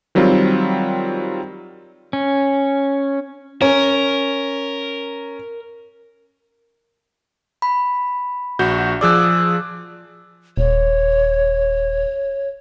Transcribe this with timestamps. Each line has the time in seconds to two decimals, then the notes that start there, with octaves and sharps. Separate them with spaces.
0.15 D#3 F#3 G3 C4 F4
2.13 C#4
3.62 C#4 A#4
7.62 B5
8.59 A#1 F#4 G6
9.01 F3 G#4 D5 D6 E6 F#6
10.57 D#1 C#5